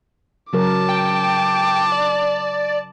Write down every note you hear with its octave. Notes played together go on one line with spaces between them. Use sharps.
C#3 F#3 A#4 A5 D6
G5
D5